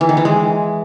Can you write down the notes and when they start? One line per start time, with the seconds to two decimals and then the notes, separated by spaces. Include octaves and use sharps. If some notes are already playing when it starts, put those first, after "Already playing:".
0.01 E3
0.09 D#3
0.17 E3
0.25 G#3